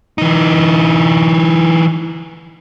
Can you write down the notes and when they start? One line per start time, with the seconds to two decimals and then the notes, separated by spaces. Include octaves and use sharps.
0.18 E3 D#4